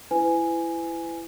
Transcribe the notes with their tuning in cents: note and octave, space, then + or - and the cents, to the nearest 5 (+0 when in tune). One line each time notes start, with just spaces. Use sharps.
E4 +20 B4 +35 G#5 +0